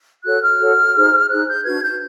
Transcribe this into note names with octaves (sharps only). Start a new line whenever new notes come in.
F#4 A4 C#5 F#6
F6
F#4 A4 C#5
D#4 G#4 C5
D#4 G#4 C5 F#6
G6
D4 F#4 B4 G#6
G6